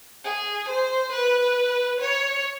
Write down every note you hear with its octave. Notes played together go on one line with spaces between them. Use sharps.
G#4
C5
B4
C#5